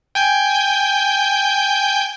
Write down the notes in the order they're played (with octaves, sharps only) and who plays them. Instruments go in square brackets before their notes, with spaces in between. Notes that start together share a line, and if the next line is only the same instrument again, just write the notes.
[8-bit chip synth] G5 G#5 G6